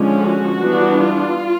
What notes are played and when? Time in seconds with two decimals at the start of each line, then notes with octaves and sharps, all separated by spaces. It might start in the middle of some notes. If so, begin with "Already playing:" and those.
Already playing: D3 F3 G#3 C#4
0.23 F#4
0.60 E3 G3 B3 D4
0.98 F4